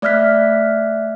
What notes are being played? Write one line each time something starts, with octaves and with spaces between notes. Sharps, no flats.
A3 D5 E5 F6 F#6 B6